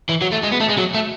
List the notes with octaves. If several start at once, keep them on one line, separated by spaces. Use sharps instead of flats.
E3
F#3
A3
G#3
B3
A3
G#3
F#3
A3